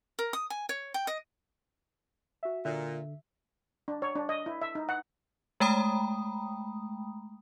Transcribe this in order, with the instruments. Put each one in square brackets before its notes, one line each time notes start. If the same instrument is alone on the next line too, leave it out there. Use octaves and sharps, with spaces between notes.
[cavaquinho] A#4
D#6
G#5
C#5
G5
D#5
[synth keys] F#4 E5
[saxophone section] A#2 [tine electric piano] D3 [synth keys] E5
[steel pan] D4
C#5
D4
D#5
E4
E5
D#4
F#5
[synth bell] G#3 A3 G5 A#5 B5 D#6